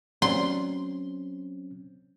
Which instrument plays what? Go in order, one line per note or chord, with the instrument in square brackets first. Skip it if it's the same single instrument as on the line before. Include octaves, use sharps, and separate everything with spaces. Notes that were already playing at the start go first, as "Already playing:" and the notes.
[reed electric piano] F#3 C4 C#4 [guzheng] C6